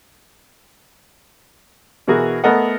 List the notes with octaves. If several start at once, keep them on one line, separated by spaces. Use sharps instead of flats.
B2 E3 F#4 G#4 A#4
A3 B3 A4 A#4 D#5 F#5